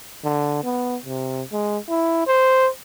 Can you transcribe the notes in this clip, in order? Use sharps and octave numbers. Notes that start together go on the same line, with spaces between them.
D3
B3
C3
G#3
E4
C5